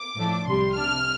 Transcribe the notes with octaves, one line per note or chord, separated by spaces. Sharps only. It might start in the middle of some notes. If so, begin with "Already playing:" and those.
Already playing: D6
A2 F3 A3 D4
C2 C3 G3 C6
C3 G3 D4 F6